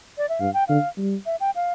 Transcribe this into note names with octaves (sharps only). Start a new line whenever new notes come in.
D5
E5
G2 F5
G5
D3 F5
G3
E5
G5
F5